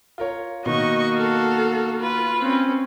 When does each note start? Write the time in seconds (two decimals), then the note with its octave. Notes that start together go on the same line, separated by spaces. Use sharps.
0.18 F4 A#4 C#5
0.66 B2 D#3 A#3 F#4 D#5 C#6
1.15 A4 F5
2.00 F4 B4
2.40 C4 C#4